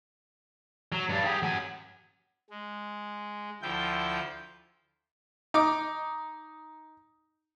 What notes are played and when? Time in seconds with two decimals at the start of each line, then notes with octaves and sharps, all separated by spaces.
0.92 F#3
1.09 G2 D4
1.25 G4 G#4
1.43 F#3 G#5
2.50 G#3
3.62 D2 F3 E4 F4 G5 G6
5.54 D#4 D6